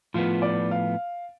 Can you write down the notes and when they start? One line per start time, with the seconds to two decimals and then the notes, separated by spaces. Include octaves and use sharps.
0.14 A2 F3 B3 F4
0.42 D5
0.71 F5